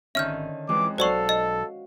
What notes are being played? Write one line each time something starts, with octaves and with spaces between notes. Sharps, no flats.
G#1 D3 D#3 C#4 E5 F6 G6
F2 E3 G#3 D6
B1 F#4 A4 C5 D5 F5 C#6
D#5